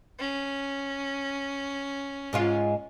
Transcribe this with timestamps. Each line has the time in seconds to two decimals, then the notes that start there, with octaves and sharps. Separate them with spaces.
0.19 C#4
2.33 G#2 G#3 F4